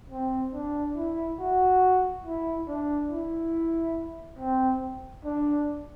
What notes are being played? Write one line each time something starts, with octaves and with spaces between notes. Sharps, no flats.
C4
D4
E4
F#4
E4
D4
E4
C4
D4